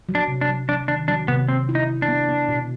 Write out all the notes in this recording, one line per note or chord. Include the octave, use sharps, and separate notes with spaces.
F#3
D4
C3
D4
F#3
F#3 D4
D#3 D4
F#3 D4
C3 B3
B3 C4
E4
D#4
E4
D4
B3
B3
B2